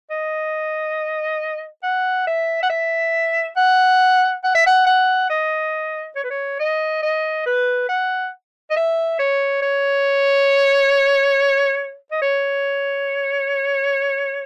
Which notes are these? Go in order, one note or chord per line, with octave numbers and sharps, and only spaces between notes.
D#5
F#5
E5
F#5
E5
F#5
F#5
E5
F#5
F#5
D#5
C#5
B4
C#5
D#5
D#5
B4
F#5
D#5
E5
C#5
C#5
D#5
C#5